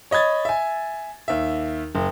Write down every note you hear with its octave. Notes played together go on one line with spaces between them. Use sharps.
C#5 D#5 B5 G#6 A6
E5 G#5
D#2 E5
F#1